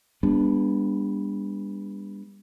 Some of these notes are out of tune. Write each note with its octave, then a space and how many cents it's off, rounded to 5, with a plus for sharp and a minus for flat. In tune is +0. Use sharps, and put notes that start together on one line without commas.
G3 +40 B3 -15 D4 -5